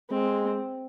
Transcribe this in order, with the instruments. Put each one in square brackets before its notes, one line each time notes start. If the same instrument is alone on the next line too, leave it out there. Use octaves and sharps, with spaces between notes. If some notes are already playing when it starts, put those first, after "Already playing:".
[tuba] G#3 [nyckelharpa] C4